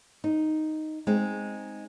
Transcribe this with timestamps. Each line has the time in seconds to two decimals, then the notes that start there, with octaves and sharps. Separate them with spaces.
0.24 D#4
1.07 G#3 C4 D#4